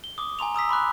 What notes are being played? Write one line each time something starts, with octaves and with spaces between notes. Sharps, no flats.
G7
D6 D#6
G#5 A#5 C6 F7
A#5 D#6 E6 B6
B5 C6 D6 F#6